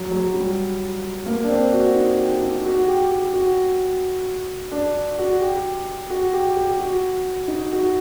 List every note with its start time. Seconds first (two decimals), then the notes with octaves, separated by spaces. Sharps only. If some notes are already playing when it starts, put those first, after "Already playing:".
Already playing: F#3
0.11 F#3
0.34 G3
1.26 A#3
1.44 D4
1.49 C4
1.72 F#4
1.95 D#4
2.19 G4
2.42 D#4
2.65 F#4
2.88 G4
3.10 G4
3.33 F#4
4.72 D4
5.18 F#4
5.41 G4
6.10 F#4
6.33 G4
6.56 G4
6.79 F#4
7.48 D#4
7.72 F#4